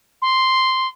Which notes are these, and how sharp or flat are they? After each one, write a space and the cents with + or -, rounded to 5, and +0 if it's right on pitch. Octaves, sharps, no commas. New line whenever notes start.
C6 -5